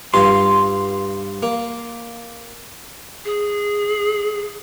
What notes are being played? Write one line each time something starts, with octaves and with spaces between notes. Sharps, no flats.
G2 F4 C6
A#3
G#4